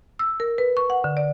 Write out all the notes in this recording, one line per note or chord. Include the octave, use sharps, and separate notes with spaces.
E6
A#4
B4
C#6
F#5
D3
D5